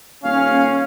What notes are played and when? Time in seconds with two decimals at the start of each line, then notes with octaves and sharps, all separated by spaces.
0.24 D#1 C#4 F5